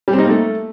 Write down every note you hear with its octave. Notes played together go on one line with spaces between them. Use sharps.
G3
C4
D#4
A#3
A3